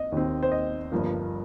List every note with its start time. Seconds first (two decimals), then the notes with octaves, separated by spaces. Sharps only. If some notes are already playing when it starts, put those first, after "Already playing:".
Already playing: C4 D#5
0.12 D#2 D#3 C4
0.43 C5
0.52 D#5
0.92 G1 G2 F3 A#3